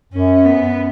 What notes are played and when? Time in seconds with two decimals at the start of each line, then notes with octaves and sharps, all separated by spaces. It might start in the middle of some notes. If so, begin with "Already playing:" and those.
0.13 F#2 C#4
0.45 B3